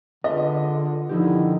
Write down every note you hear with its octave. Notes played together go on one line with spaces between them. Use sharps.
D3 F4 G#4 B4 D#5
D3 D#3 F3 D#4 E4 G4